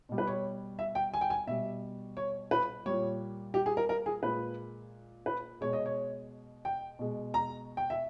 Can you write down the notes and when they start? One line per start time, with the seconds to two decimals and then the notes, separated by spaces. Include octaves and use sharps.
0.09 B2 G3
0.18 B4
0.27 C#5
0.79 E5
0.95 G5
1.14 G#5
1.21 G5
1.30 G#5
1.47 B2 G3 E5
2.17 C#5
2.51 B4
2.86 A#2 G3 C#5
3.54 G4
3.66 G#4
3.77 A#4
3.89 A#4
4.06 G#4
4.23 A#2 G#3 B4
5.26 B4
5.61 B2 G#3 C#5
5.73 D#5
5.86 C#5
6.65 G5
6.99 B2 G#3
7.34 A#5
7.77 G5
7.90 E5